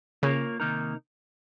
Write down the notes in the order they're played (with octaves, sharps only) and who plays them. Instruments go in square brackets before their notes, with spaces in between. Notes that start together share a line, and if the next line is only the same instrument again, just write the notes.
[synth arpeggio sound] C#3 [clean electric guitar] A#3 F4 A#4 C#5
[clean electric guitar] C3 D#3 A#3 D#4 A#4